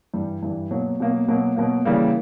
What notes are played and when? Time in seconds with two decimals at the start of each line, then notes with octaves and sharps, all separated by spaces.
0.14 G2 E3 G3
0.43 G2 E3 G3
0.71 B2 F#3 A#3
1.00 B2 F#3 A#3
1.28 B2 F#3 A#3
1.57 B2 F#3 A#3
1.85 C#3 E3 G3 A#3